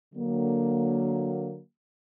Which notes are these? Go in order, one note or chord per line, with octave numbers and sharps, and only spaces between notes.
D3 F#3 A#3